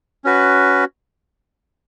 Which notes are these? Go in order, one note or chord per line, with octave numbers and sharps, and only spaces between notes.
C#4 F#4 B4